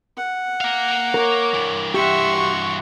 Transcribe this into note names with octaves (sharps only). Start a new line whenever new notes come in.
F#5
A#3 F5
A#4 C#5 D6
G2 E3
G4 E5 F#5 C6 C#6
F#4